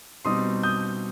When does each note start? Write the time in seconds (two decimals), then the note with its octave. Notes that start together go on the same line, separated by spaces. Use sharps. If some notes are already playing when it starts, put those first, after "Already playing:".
0.25 B2 G3 C4 D#4 C6 D#6
0.63 D#6 G6